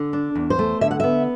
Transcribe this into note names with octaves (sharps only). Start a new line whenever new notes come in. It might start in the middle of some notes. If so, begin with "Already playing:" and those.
Already playing: D3
D4
E2
C5
A3
D3 E5
F#5
B3 E5